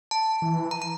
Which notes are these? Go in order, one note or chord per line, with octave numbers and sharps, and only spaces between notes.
A5
E3
A#5
A#5